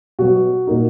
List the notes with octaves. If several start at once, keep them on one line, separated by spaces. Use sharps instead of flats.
B2 F#3 B3 F#4
A#2 A#3 D#4